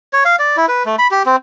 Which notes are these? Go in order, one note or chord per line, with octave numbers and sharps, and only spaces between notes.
C#5
F5
D5
E4
B4
A3
B5
G4
C4